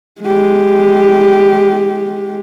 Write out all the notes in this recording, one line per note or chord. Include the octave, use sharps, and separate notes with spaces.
G#3 G4